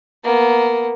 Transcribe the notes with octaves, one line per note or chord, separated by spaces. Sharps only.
A#3 B3